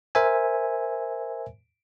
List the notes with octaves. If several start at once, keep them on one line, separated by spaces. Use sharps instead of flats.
A#4 C5 E5 G#5